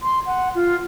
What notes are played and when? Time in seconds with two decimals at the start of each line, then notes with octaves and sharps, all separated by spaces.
0.02 C6
0.26 F#5
0.55 F4